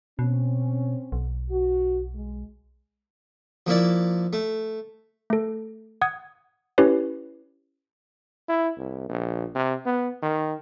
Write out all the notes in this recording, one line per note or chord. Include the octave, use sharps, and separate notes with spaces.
B2 C4 C#4
B1
F#4
G#3
F3 A#3 E4 D5
A3
A3 A4
F#5 D#6 G#6
C#4 E4 G4 B4 C#5
E4
C2
A#1
C3
B3
D#3